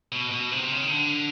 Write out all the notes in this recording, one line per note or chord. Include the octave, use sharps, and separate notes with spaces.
B2
B2
C3
C#3
D#3
D3